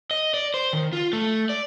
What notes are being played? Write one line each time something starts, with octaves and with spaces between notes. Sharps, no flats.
D#5
D5
C5
D#3
F4
A3
D5